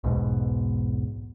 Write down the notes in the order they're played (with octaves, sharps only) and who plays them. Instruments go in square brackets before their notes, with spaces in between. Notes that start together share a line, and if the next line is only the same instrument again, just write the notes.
[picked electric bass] B1 E2 G#2 B2